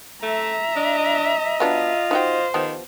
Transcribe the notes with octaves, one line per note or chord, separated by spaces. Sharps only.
A3 E5 A#5
D4 D#5
F#3 B3 D4 F4
D#4 F#4 C5 G5
D#3 F3 B3 G4